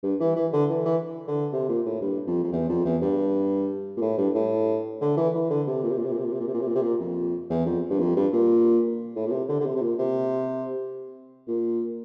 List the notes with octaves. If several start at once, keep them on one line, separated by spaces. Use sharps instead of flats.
G2
E3
E3
D3
E3
E3
D3
C3
A#2
A2
G2
F2
F2
E2
F2
E2
G2
A#2
A2
G2
A2
D3
E3
E3
D3
C3
A#2
C3
A#2
C3
A#2
C3
A#2
C3
A#2
C3
A#2
C3
A#2
C3
A#2
F2
E2
F2
G2
F2
G2
A#2
A2
A#2
C3
D3
D3
C3
C3
A#2
C3
A#2